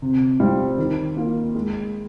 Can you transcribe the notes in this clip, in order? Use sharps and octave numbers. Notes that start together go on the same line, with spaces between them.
C3
G3 C4 F4
D#3
A#3 F4 A#4
G#3